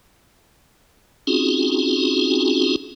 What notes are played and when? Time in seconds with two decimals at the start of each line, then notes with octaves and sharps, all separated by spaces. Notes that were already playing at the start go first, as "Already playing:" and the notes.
1.27 C4 C#4 D#4 F4 F#4 G#4